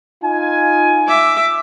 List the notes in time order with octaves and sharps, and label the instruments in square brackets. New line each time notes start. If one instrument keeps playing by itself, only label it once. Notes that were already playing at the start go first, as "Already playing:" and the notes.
[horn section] D#4 F4 G#5
[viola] E5 D6